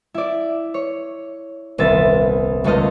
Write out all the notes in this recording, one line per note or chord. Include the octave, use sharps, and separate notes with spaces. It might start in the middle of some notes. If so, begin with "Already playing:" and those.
E4 D5
C#5
D#1 C2 B3 E5 A6
D#1 C#2 A3 A4 D#5 F6